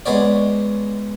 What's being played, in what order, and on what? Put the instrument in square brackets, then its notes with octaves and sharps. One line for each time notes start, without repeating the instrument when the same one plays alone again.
[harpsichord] G#3 B3 C#5 D5